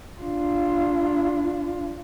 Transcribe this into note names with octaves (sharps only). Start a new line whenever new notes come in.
D4 F4